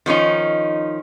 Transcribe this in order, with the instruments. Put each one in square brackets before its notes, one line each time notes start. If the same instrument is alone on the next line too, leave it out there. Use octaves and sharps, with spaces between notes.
[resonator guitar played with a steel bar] D#3 F3 C#4 D#4